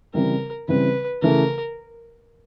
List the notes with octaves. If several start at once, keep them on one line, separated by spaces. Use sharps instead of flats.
C#3 E3 G3 C4 A#4
C#3 E3 G3 C4 B4
C#3 E3 A3 A#4